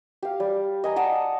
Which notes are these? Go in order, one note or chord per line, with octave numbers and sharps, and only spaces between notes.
G4 F5
G3
D#5 G#5 A#5
D5 D#5 F#5 A5